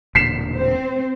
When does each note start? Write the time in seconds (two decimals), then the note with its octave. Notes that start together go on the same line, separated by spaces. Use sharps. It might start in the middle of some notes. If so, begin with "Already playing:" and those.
0.15 E1 A#2 D3 B6 C7 E7
0.55 C4 C5